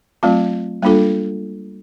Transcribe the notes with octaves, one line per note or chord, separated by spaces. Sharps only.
F#3 A3 C4 F4
G3 A#3 D4 F4 A4